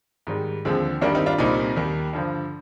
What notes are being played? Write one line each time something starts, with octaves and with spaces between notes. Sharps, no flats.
G#2 D#3 G3
D#2 D3 F3 G#3 C4
G2 D#3 G3 A#3 D4
C4 D#4
D4 F4
C2 A#2 G3 C4 D#4
D#2 D#3 G3
G2 D3 F3